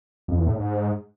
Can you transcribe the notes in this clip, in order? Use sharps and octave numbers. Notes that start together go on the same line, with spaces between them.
F2
E2
A2
G#2